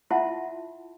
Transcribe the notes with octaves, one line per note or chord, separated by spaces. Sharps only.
E4 F4 E5 F#5 A5 C6